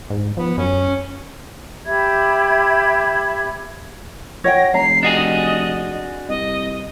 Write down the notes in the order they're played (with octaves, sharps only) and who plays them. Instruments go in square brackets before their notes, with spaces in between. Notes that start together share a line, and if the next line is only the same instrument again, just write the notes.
[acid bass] G#2
[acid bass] F3 [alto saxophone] B3
[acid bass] F#2 [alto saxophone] C#4
[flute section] G4 E5 B5 G#6
[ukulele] C#5 F#5 G5 [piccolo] A#6
[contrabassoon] F1 [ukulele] A#5 [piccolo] C7
[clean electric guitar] D4 F#4 G#4 [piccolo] D#5
[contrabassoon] C2 [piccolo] D#5